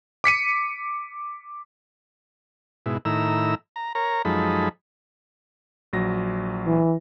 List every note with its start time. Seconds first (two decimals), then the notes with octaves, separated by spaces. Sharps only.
0.24 D6 B6 C#7 D#7
2.86 G#2 B2 E4
3.05 A2 D#3 E4 A#5 E6
3.76 A#5
3.95 A#4 C#5 A#5
4.25 F#2 F3 G#3 D#4 A4 B5
5.93 A#1 F#3 A#6
6.66 E3